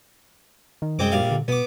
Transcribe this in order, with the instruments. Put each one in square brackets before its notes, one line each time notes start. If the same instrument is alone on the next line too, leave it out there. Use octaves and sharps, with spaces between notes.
[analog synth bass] D#3
[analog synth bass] F#2 [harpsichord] G#3 C4 D6
[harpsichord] A#1 G3 F5
[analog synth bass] D3
[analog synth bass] B2 [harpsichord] B3 D6